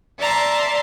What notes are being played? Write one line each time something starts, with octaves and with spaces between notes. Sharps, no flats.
D5 E5 A5 A#5 C6